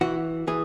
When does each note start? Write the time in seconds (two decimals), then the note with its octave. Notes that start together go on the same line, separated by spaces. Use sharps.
0.01 E3 F#4
0.47 E3 G#4